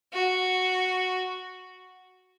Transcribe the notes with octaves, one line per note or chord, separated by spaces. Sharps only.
F#4